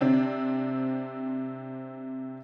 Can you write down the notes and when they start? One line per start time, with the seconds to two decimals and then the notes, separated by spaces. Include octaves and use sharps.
0.01 C3 C4 D4